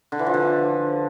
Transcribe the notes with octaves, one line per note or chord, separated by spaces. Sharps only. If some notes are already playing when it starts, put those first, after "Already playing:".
D3
E3
F3
D3